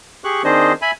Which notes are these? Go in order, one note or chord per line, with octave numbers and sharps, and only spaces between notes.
G4 G#4 C#6 F#6
D#3 C4 D4 G#4 C5 D#5
E5 G#5 B5